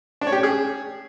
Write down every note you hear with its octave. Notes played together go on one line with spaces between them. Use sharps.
D4
C#5
G4
C#5
G#4